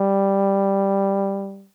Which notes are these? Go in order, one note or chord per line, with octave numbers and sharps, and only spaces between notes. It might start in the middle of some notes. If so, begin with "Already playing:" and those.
Already playing: G3